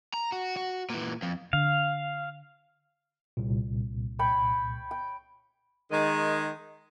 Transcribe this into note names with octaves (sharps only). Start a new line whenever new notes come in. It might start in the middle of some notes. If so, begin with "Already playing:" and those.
A#5
F#4
F#4
A#2 E3
F2
D3 F5
C2 A#2
C#5 G5 B5
G5
D#3 G#3